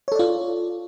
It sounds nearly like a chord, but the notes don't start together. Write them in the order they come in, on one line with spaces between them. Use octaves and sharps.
C#5 A4 D5 F4